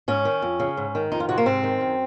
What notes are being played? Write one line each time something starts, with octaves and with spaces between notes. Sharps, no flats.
G#2 C#4
D#3
F2
C#3
G#2
D#3
F2 D#4
F4
C3 F#4
A#3
G#2 C4
D#3
F#2